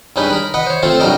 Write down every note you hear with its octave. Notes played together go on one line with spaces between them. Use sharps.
G2 G#3 C#4 D#4 B4
A#4 B5
B4 D#5 F#5
C5 C#5
A3 C4 F4 A4 C5
C2 G2 F#3 G3 A#4 D#5